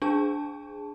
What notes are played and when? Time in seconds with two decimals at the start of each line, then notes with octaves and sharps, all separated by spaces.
0.02 D4 G#4 A5